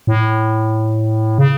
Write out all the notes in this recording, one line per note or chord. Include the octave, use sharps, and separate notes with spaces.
A2
C#3